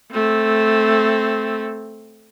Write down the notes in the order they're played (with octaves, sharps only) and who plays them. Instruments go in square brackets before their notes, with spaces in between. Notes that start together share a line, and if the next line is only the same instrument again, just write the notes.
[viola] A3 C4